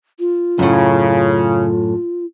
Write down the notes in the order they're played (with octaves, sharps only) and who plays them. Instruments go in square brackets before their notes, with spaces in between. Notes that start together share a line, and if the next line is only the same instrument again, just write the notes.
[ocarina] F4
[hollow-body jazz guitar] F#2 A2 [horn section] C#3